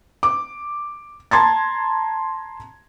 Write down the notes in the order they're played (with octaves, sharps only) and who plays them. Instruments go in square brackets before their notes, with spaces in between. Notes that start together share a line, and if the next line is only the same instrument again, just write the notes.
[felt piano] D6
A5 A#5 C6 G#6 A6